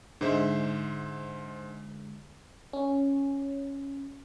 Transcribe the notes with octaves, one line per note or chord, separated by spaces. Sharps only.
G#2 D3 G#3 C5 E5
C#4